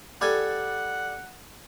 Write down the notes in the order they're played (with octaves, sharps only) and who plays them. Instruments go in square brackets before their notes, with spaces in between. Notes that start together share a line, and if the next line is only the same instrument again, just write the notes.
[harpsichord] G3 A4 G#5 [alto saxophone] F#5